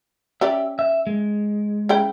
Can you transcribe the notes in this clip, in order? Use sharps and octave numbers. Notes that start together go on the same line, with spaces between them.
C#4 G4 D5 E5
E5
G#3
C#3 E4 G5